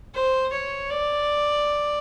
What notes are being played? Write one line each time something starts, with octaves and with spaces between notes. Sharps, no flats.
C5
C#5
D5